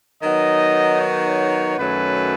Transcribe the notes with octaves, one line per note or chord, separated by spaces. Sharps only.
D#3 F#3 B3 D#4 D#5
C#5
F#2 D#3 F#3 A3 C#4 B4